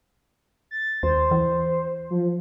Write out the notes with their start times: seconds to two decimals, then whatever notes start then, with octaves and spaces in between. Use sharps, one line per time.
0.71 A6
1.03 D#2 C5
1.31 E3
2.10 F3